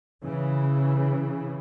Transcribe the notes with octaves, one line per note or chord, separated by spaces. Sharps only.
C#3 E3